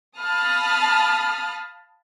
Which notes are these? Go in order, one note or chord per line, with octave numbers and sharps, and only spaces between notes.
F5 A5 B5 D#6 F6